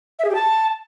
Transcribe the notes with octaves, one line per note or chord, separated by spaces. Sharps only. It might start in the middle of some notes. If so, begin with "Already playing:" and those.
E5
G#4
G4
A5